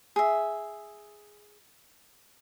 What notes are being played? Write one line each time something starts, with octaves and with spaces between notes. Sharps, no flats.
G#4 E5